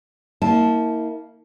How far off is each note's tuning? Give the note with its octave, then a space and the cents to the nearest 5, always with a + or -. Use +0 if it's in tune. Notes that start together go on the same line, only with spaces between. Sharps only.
A#3 -10 E4 -40 A5 -10